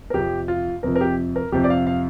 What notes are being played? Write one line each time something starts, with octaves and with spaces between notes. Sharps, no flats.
A#4
F2 C3 F3 G4
F4
F2 C3 F3 A#4
A#4
G4
A#4
F2 C3 F3 G4
D5
F5
F5